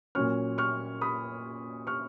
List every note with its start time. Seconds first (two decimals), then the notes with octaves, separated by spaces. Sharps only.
0.15 A#2 F#3 C#4 C#6 F6
0.58 C#6 F6
1.01 B5 D#6
1.87 C#6 F6